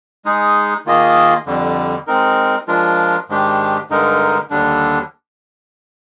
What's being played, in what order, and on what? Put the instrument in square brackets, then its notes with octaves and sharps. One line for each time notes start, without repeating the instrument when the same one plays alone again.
[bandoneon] G#3 D#4 G#4
D#3 A#3 F4 G#4 D#5
F2 D3 G3
G#3 C4 D#4 A#4
F3 G#3 D4 F4 A#4
G#2 D#3 G#3 D4 G4
G2 D3 G#3 D#4 A#4
D#2 D3 G3 D4